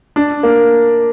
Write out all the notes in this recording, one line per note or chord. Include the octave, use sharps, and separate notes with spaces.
D4
A#3